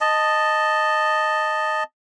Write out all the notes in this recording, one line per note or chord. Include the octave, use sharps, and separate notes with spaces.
D#5 A5